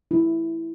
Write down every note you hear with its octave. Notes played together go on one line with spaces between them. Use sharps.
E4